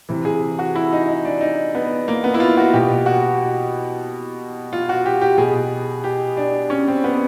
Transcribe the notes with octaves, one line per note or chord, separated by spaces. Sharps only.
C3 E3
G#4
F#4
E4
D#4
D#4
D4
D#4
B3
A#3
B3
E4
F4
F#4
B2 G4
F#4
F4
F#4
G4
G4
B2 G#4
G4
D4
C#4
C4
B3